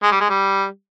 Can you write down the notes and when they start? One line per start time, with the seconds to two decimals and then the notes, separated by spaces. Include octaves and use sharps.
0.03 G#3
0.12 G3
0.21 G#3
0.29 G3